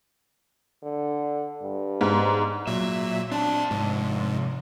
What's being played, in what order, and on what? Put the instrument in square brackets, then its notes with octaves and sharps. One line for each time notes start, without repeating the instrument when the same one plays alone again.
[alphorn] D3
G2
[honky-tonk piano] G#2
[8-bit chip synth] A#2 F#3 [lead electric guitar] E5
[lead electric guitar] C4 A5 [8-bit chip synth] D4
[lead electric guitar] F2 C3 [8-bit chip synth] G#2